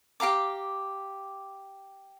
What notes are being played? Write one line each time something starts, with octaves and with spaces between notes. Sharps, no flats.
G4 F5 A#5 D6